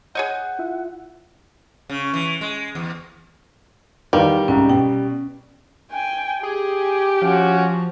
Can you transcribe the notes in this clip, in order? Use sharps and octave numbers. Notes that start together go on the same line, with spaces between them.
G#4 C#5 D#5 F#5 G6
E4 F4 E5
C#3
E3
G#3
E2
E2 D#3 G3 B4 D5 F5
C2 G#2 C#4
B2 G5
G5 G#5
G4 G#4
F3 C#4 F#4